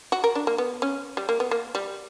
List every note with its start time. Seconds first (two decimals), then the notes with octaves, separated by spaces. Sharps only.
0.12 F#4
0.24 A#4
0.35 D4
0.47 A#3
0.58 B3
0.82 C#4
1.17 G3
1.29 A#3
1.40 B3
1.51 A#3
1.75 G3